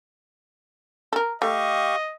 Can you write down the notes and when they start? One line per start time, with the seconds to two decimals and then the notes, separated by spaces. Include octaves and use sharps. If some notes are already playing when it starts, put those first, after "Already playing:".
1.13 A4 A#4
1.42 A3 G4 D#5 F5 C#6